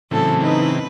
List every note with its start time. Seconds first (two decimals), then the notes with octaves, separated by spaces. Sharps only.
0.11 A2 C#3 E3 F#3 C4 A4
0.43 D#4 B4